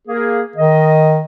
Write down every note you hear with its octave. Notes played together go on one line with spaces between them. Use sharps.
A#3 G#4 A#4
D#3 D#5